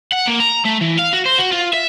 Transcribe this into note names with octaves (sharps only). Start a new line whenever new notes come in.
F#5
A#3
A#5
A3
E3
F5
F#4
C5
F#4
F4
E5